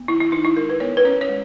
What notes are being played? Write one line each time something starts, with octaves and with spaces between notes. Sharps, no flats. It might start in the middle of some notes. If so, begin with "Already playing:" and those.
Already playing: B3
D#3 E4
E4
D#3 D#4
E4
G#3 A#4
B4
B3 C#5
B4
C#4 C#5
C#5
G#3